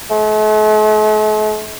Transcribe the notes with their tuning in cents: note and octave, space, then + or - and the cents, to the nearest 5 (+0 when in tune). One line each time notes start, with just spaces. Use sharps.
A3 -45